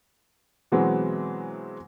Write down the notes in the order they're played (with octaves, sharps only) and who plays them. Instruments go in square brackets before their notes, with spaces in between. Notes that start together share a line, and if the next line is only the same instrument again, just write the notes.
[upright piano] B2 E3 F#3 G#3 B3 C4